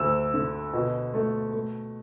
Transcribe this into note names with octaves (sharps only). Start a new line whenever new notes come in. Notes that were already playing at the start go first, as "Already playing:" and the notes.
Already playing: D2 E6
D3
B2
A3
A3